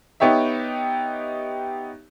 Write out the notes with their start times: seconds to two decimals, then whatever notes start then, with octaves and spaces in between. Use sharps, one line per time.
0.20 B3 D#4 G4 C#5 E5